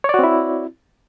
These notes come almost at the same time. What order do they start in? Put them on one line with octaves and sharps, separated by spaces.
C#5 D5 F#4 C4 E4